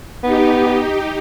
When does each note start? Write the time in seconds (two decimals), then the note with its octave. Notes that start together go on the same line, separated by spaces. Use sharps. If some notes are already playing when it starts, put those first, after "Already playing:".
0.24 B3 D#4 G4